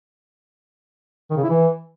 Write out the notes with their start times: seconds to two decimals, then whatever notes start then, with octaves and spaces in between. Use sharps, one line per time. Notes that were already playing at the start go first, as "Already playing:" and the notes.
1.31 D#3
1.37 C#3
1.43 E4
1.50 E3